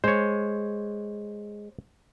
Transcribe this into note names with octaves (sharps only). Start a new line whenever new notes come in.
G#3 C5 C#5